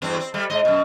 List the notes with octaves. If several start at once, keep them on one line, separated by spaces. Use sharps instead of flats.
E2 G2 C4
C4
G3 A3
G#2 D#5
F#2 B2